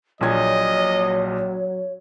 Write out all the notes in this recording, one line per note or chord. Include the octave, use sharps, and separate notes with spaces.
A#1 A#2 F#3 C#5 D#5 G#6